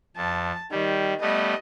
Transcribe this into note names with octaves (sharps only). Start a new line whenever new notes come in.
F2 A5
D#3 G3
G3 A3 B3 D#5